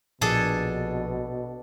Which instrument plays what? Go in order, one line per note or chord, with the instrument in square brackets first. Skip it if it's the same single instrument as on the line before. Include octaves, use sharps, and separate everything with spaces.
[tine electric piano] A#1 [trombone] B2 [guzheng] D4 G#4 A4